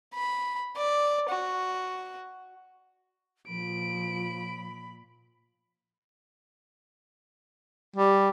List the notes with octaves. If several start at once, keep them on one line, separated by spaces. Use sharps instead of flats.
B5
D5
F#4
A#2 F3 B5 D7
G3